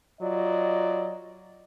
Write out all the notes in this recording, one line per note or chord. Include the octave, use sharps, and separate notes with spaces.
F#3 F4 D5 D#5